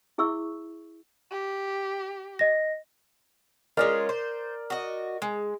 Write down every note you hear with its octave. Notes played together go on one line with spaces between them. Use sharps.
E4 G#4 E5 C#6 E6
G4
D#5 A#6
G#3 C#4 F4 A#4 D5 F6
C5
F#4 D#5
G#3